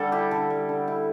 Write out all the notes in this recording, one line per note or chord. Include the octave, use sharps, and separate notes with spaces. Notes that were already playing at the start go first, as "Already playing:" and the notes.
Already playing: D3 G3 A4 D5
E4 G4
D3 A4
G3
D3
E4